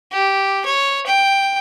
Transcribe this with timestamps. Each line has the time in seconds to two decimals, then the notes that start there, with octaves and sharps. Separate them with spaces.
0.12 G4
0.65 C#5
1.07 G5